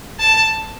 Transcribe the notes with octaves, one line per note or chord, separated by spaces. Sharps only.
A5